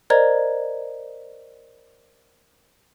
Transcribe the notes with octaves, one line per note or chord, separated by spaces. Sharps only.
A#4 C5 D5 D#5 A#5 G#6